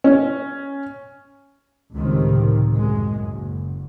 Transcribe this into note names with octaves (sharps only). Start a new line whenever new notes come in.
C#4
C#2 A2 C3 D#3 F3
F#2 G#3
F#1